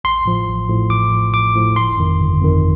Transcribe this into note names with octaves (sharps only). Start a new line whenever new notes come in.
A1 C6
A2 F3
A1
A2 F3
A1 D6
A2 F3
A1 D6
A2 F3
G1 C6
F2 D#3
G1
F2 D#3